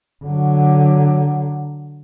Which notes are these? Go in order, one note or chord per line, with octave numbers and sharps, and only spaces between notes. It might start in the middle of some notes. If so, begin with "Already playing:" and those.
D3 F#3